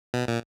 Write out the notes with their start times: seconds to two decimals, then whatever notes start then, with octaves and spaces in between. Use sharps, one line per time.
0.14 B2
0.28 A#2